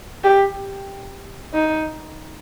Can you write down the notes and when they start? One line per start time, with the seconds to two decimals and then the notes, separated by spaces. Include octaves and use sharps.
0.24 G4
1.54 D#4